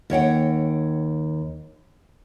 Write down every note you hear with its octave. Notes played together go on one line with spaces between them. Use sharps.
D#2 C#5 F#5 G5